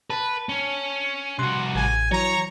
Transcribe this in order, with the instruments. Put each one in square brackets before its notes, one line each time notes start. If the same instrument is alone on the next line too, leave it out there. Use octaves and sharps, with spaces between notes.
[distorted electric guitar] B4 [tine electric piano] A5
[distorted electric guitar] C#4
[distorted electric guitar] C2 F#4 [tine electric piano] C6 F#6
[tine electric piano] A1 [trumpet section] G#5
[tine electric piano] E3 F#3 [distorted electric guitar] C#5 [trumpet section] A#5